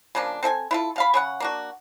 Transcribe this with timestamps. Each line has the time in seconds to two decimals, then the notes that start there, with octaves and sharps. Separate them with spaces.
0.15 C#3 F3 A#3 D4
0.43 C4 A4 E5 G#5
0.71 E4 F4 A4
0.96 B2 F5 B5
1.14 C#3 C#5 F#5
1.40 A#3 D4 F#4